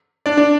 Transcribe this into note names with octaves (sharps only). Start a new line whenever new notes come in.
D4 D5
D4 D5